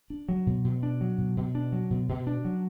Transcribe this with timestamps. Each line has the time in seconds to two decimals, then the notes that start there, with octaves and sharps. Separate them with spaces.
0.10 D4
0.29 F#3
0.47 B2
0.65 B2
0.83 D4
1.01 F#3
1.18 B2
1.36 B2
1.55 D4
1.72 F#3
1.90 B2
2.09 B2
2.27 D4
2.45 F#3